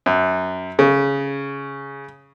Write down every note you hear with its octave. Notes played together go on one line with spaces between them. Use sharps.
F#2
C#3